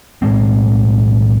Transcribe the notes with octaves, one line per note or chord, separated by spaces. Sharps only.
B1 A2 G#3 C4